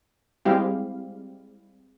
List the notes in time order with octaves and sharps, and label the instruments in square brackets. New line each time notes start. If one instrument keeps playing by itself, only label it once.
[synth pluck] G3 G#3 C4 E4 G4 F5